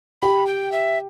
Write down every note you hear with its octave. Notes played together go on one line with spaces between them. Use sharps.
G4 B5
G5
E5